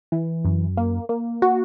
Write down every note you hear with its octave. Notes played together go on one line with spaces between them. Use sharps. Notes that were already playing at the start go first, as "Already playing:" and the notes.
E3
F#2
A#3
A#3
F#4